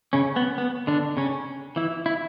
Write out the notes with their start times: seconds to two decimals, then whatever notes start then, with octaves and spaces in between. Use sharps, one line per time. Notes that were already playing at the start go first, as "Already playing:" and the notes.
0.13 C#3 C#4
0.36 B3
0.58 B3
0.87 D3 D4
1.17 C#3 C#4
1.76 E3 E4
2.06 E4